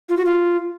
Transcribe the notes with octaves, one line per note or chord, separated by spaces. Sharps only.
F4
F#4
F4